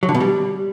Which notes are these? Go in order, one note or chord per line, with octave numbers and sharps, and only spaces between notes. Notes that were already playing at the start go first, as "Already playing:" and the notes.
F#3
D3
B2
G3